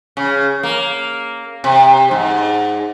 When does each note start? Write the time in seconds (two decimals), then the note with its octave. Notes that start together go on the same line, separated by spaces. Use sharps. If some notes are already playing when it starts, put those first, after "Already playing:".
0.17 C#3
0.63 A#3
1.64 C3
2.11 G#2